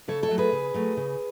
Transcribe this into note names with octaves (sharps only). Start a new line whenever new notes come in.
C#3 A4 C#5
A4 C#5
F#3 A3
G#4 B4
C#3
F#3 A3
C#3